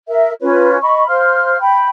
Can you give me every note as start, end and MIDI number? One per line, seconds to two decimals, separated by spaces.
0.08 0.32 70
0.08 0.32 76
0.41 0.77 61
0.41 0.77 65
0.41 0.77 71
0.41 0.77 73
0.82 1.07 75
0.82 1.07 83
0.82 1.07 85
1.08 1.58 72
1.08 1.58 77
1.08 1.58 84
1.08 1.58 89
1.60 1.89 79
1.60 1.89 83